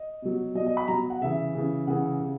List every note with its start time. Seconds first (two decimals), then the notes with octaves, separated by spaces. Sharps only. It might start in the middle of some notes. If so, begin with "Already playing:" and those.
Already playing: D#5
0.22 B2 F#3
0.55 F#3 D#5
0.58 B2
0.66 D#5
0.77 B5
0.88 B2 F#3 A#5
1.10 F#5
1.21 C#3 E3 E5
1.55 C#3 E3
1.87 C#3 E3 F#5
2.20 C#3